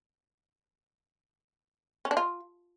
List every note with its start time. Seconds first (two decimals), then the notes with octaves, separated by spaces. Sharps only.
2.05 C#4
2.11 D4
2.17 F4